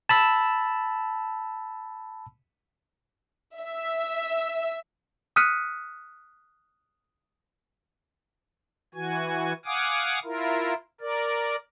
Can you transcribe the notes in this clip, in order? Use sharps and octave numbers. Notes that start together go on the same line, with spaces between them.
A5 B5 E6
E5
D#6 F6 F#6 B6 C#7 D#7
E3 F#4 G#5
F5 F#5 G#5 D6 D#6
E4 F4 A#4
A#4 D5